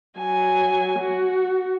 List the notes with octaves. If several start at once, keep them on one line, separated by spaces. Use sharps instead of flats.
F#3 G#5
F#4